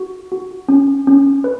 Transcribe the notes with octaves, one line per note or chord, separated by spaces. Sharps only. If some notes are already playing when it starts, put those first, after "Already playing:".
Already playing: F#4
F#4
C#4
C#4
B4